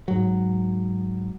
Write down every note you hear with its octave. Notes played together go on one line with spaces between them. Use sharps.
G#2 F#3